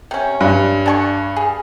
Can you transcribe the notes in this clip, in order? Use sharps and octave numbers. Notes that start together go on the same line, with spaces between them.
C3 C#4
G2
D4 G#5 C#6
G#4